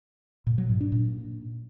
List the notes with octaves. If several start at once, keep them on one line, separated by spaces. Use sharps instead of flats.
A#2
F#3
G#2
D4
A#2